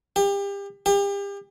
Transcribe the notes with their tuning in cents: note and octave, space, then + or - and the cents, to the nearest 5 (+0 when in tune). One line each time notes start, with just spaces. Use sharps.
G4 +30
G4 +35